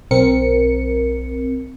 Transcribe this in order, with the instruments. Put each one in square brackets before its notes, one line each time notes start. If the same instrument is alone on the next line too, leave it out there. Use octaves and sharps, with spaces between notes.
[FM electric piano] B1 C4 A#4 C#7